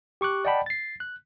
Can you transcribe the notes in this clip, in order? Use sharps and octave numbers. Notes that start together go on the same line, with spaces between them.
G4 C#6 D6 F#6
D5 D#5 F#5 G5 A5 B5
A6 C7
F#6